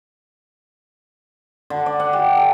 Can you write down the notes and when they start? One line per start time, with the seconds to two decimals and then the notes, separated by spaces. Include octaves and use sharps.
1.70 D3
1.86 D5
2.00 F#5
2.13 G4
2.37 A4